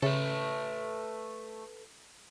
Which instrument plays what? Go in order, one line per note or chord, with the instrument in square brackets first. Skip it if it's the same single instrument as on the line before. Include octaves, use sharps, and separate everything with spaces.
[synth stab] C#3 [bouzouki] A3 [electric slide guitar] A4 B4